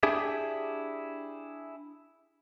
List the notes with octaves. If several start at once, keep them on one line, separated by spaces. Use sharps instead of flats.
D4 E4 G4 G#4 E5